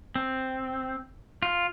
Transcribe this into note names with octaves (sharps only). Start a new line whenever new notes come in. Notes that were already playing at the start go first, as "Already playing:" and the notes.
C4
F4